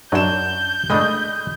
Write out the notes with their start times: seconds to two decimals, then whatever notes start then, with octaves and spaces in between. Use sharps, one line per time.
0.12 F#2 F#3 D4 D#5 G6 E7
0.90 G#3 A3 D4 D#5 B5 D#6